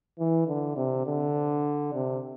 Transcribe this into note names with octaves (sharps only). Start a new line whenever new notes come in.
E3
D3
C3
D3
C3